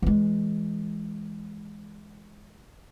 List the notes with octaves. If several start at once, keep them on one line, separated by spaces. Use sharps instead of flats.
E3 G#3